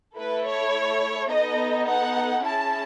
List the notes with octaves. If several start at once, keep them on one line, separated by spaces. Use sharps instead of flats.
A3 E4 A4 B4
C#5
B3 D#4 A4 D#5
F#5
C#4 E4 G#4 A5